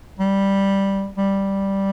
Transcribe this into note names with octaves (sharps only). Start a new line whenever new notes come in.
G3
G3